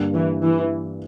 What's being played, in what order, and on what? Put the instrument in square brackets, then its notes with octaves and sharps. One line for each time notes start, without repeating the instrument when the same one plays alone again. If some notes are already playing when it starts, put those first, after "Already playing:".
Already playing: [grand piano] G2 D3 G3 A#3
[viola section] E3
E3